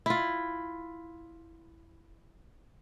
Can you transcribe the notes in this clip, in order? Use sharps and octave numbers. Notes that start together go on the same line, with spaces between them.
E4 F4